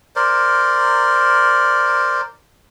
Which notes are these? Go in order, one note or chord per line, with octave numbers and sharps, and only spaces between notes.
A#4 C5 D5